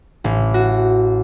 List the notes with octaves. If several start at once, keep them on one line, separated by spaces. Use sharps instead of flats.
A1
F#4